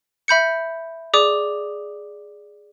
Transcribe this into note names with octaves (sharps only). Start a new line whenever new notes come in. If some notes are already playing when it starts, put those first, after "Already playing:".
E5 B5 G6 C#7
G#4 D5 D6 D#6